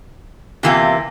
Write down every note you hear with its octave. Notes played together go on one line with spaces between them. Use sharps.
E2 C3 E3 A#3 F4